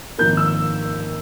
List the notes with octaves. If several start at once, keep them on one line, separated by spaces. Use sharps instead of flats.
G#1 G#2 F3 A#3 G6
E6